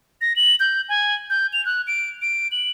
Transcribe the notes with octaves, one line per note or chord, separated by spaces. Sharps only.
A#6
F#7
G6
G#5
G6
F7
F#6
D7
D7
F#7